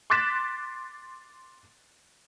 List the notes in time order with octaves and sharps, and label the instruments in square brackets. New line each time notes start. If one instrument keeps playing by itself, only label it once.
[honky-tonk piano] C6 D6 F#6 A6 B6 E7